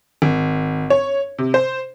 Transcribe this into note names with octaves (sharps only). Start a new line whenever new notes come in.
G#1
C#5
C3
C5